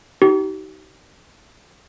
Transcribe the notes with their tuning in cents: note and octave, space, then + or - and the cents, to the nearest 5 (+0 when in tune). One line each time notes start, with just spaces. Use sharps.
D#4 +20 G4 -40